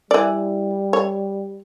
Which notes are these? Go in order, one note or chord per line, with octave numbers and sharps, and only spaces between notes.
E3 G3 D5
C#5